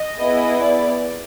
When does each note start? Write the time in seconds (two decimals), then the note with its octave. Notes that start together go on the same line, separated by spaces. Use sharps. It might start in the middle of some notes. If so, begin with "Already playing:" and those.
Already playing: D#5
0.19 B3 E4 G#4
0.62 D5